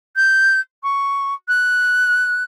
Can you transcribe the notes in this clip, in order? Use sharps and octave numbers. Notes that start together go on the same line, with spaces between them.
G6
C#6
F#6